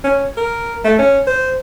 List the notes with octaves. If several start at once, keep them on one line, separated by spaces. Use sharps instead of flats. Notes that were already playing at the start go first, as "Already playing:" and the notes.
C#4
A#4
A3
C#4
C5